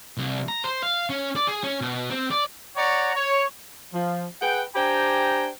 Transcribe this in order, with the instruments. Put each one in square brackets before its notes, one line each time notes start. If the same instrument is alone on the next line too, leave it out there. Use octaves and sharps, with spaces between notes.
[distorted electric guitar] C2
A#5
C5
F5
C#4
D5
G#4
C#4
B2
C4
D5
[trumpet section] C#5 D5 F#5 A#5 C#6
C#5
[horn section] F3
G#4 B4 F#5 G5
D4 G4 C5 G5 G#5 A#5